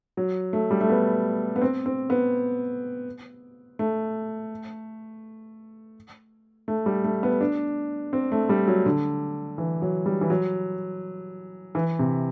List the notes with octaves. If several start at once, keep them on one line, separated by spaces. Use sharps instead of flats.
F#3
A3
G3
A3
B3
B3
C4
C4
B3
A3
A3
G3
A3
B3
D4
C4
A3
G3
F#3
D3
E3
F#3
G3
E3
F#3
E3
C3